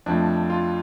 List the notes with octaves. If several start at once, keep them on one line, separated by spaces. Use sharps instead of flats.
F2 F3 A3 D4
F4